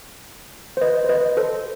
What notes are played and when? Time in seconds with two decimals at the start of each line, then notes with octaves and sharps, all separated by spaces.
0.77 C5
0.81 B4 D#5
1.04 C5
1.09 B4 D#5
1.37 A4 C5